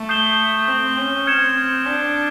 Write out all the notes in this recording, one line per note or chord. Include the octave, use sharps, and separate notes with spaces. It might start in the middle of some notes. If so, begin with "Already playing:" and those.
Already playing: A3
D#6 G6 C7 E7 G7
C4
C#4
C4 F6 G#6 C#7 E7
D4